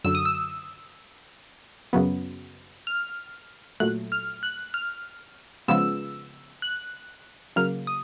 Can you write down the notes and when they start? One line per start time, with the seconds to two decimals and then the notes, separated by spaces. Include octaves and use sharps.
0.04 F#2 D3 F#3 E6
0.15 D#6
0.25 E6
1.93 F#2 C#3 F#3 B3
2.87 F6
3.80 A#2 F#3 A3 F#6
4.12 F6
4.43 F#6
4.74 F6
5.68 C#3 F3 G#3 B3 E6
6.62 F#6
7.56 C#3 F#3 A#3 F6
7.87 D#6